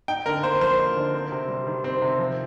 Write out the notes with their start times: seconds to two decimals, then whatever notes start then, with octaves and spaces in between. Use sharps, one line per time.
0.08 D#4 G5
0.25 D3 A#4
0.43 A#3 C5
0.61 F3 C5
0.78 D#4
0.96 D3
1.14 C4
1.32 C3
1.49 G3
1.67 D#3
1.84 C4
2.02 C3
2.19 F3